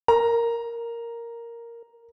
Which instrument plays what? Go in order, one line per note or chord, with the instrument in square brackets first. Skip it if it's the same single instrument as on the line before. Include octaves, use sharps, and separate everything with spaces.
[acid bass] A#4 [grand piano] A#5